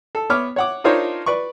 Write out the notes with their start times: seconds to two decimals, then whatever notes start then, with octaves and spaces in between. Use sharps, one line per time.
0.15 A4
0.30 B3 C#5 D6 F6
0.56 C#5 F#5 D6
0.84 D4 D#4 F4 A#4 C5 C#5
1.26 B4 D5 C#6